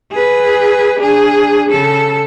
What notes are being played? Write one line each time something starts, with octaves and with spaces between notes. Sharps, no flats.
G#4 B4
D4 G#4
C#3 A4